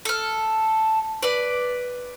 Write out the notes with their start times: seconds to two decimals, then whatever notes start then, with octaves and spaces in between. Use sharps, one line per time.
0.05 A4 F6
1.23 B4 D5